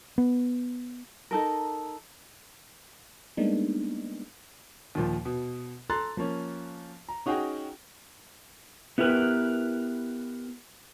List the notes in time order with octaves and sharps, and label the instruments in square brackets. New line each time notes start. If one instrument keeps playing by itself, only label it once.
[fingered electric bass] B3
[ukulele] D#4 A4 A#4
[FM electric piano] G3 G#3 A#3 B3 D4 D#4
[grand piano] D#2 A#2 F3
B2
A4 A#5 C6 F#6 A6
F3 A#3 C#4
A#5
C#4 D#4 F#4 G#4 F#5 G5
[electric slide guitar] B3 E4 G4 A#4 B4